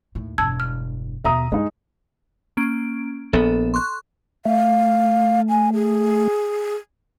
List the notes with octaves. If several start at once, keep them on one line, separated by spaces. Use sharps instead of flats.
D#2 A2
E1 G2 A5 E6 G#6
F6
D#2 B2 E5 A#5 D#6
G2 G#3 D#4
A#3 C#4 D7
A#1 B3 A4
C6 C#6 F#6
A3 F5
G#5
G#4